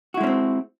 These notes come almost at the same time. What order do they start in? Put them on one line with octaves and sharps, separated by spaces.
F#4 E4 G#3 C#4 C4